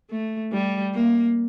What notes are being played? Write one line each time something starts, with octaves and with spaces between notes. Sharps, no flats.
A3
G3
A#3